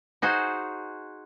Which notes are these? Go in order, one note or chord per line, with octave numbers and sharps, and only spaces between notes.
D#4 F#4 G#4 C5